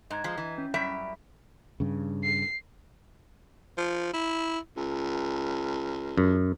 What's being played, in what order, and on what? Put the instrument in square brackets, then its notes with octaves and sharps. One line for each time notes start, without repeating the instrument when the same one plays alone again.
[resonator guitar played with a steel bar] G#2 [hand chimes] D#5 A#5 G#6
[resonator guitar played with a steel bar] F3 G#3
E3
[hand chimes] C#4
[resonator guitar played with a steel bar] F#2 G3 E5 [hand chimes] B5 D7
[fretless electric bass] G2 C#3
[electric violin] C7
[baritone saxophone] F3
E4
C#2
[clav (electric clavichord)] F#2